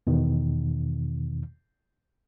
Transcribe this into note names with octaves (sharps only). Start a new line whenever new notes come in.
E2 B2 D#3